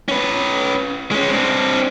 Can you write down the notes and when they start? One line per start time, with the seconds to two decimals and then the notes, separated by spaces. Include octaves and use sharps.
0.08 C#4 B4
1.11 G#3 C#4
1.30 C4 D4